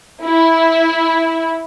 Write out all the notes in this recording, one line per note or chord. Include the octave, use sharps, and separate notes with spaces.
E4